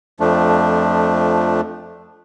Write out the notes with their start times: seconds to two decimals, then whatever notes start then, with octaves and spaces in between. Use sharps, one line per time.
0.20 F2 F3 A3 D4